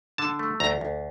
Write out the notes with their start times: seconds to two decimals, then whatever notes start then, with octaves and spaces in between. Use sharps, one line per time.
0.18 D3 A5
0.39 A3
0.60 D2 A#5
0.81 D2